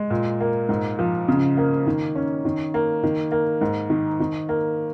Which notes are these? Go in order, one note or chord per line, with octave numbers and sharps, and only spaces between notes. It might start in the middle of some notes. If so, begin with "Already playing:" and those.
Already playing: G#3
A#2
A#3
G#2
F3
C#3
A#3
D#3
C#4
D#3
A#3
D#3
A#3
G#2
D#3
D#3
A#3